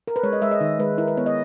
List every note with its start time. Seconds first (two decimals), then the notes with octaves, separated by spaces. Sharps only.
0.08 A#4
0.16 B4
0.23 G#3 C#5
0.33 D#5
0.41 G#3 E5
0.51 D#5
0.61 D#3
0.79 G#3 B4
0.98 E4 A#4
1.08 B4
1.17 B3 C#5
1.26 D#5